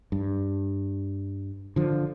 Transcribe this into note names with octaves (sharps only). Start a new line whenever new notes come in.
G2
D3 F3